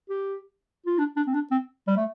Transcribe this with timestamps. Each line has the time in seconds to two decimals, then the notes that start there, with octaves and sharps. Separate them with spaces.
0.10 G4
0.86 F4
0.98 D4
1.16 D4
1.27 C4
1.34 D4
1.51 C4
1.87 G3
1.96 A3